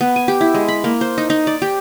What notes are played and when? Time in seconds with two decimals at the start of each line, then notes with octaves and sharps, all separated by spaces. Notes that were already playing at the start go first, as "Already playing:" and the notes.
0.01 B3
0.16 G#5
0.28 G4
0.41 E4
0.54 G#3
0.68 B5
0.84 A#3
1.01 C5
1.18 D#4
1.30 D#4
1.47 D5
1.62 G4